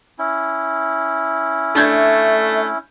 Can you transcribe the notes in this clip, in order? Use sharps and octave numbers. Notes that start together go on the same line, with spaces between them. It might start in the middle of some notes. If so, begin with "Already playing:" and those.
C#4 E4
A3 D4 E5 G6 G#6